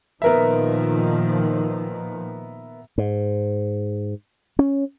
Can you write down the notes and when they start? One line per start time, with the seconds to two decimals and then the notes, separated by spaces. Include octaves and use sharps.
0.22 A#2 D#3 F3 B3 A#4 E5
2.98 G#2
4.59 C#4